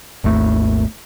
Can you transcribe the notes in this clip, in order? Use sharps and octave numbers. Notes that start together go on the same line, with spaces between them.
G#1 D#2 A3